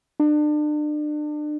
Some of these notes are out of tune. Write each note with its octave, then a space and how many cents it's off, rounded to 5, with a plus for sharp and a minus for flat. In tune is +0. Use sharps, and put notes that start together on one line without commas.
D4 +35